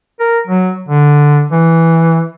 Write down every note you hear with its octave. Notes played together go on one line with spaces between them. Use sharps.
A#4
F#3
D3
E3